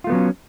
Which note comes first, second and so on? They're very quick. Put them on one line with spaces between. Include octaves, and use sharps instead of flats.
F4 A3 B3 F#3 C#4